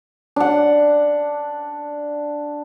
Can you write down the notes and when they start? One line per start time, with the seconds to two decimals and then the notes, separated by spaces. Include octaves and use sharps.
0.36 D4 F#5